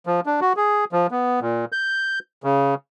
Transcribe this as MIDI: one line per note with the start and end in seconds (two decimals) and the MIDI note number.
0.06 0.20 53
0.26 0.40 62
0.41 0.53 66
0.56 0.85 68
0.92 1.07 53
1.11 1.40 59
1.41 1.65 46
1.72 2.19 91
2.44 2.74 49